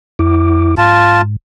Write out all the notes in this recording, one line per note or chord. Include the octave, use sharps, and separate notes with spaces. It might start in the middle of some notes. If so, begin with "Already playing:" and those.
F2 E4 D6
G#2 F4 A5